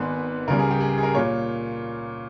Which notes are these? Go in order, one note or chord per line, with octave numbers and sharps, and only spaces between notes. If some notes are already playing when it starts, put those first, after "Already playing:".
Already playing: G#1 G#2 D#3 G#3 B3 B4
C#2 C#3 G3 A#4
G#4
G4
G#4
G#4
A#4
A#2 A#3 C#5